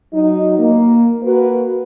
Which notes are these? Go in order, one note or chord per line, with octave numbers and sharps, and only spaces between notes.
F#3 D#4
A#3
A#3 F#4 A#4 B4